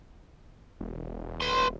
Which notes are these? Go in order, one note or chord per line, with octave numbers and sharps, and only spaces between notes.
E1
D#1 B4 C6